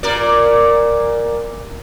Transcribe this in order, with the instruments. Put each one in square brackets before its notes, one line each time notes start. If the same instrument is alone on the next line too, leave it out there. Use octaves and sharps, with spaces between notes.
[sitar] A#2 A#4 D5